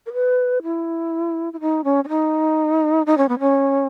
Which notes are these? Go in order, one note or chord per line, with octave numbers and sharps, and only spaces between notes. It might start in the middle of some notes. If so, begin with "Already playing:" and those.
A#4
B4
E4
E4
D#4
C#4
C#4
D#4
D#4
C#4
B3
C#4